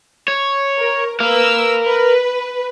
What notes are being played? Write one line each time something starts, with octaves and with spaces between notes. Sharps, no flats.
C#5
A#4
A#4 B4 F5 E6
B4